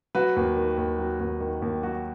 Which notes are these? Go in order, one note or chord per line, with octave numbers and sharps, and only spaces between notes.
F#3 F#4 B4
D#2
D#3
D#2
F#3
D#2
D#3
D#2
F#3 F#4